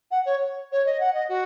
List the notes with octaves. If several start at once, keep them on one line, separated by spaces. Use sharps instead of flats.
F#5
C#5
C#5
D#5
F#5
D#5
F#4